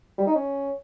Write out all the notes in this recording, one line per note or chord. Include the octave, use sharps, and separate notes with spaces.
G3
D#4
C#4